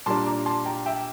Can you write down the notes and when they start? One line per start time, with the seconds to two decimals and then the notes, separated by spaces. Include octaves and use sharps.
0.06 A#2 G3 A#3 D4 A5 C6
0.26 A#5 D6
0.46 A5 C6
0.65 G5 A#5
0.86 E5 G5